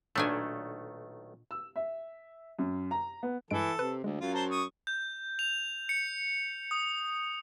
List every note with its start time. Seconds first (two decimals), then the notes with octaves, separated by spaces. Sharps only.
0.16 B1 A#2 D#3 A3 D4 G#5
1.51 E6
1.76 E5
2.59 F#2
2.91 A#5
3.23 B3
3.51 G2 E3 G#3 A4 D7
3.79 C3 B4
4.04 D2 G#3
4.20 F#2 F4
4.34 C5 A5 A#5
4.51 C#6 D#6
4.87 G6
5.39 F7
5.89 C#7
6.71 D#6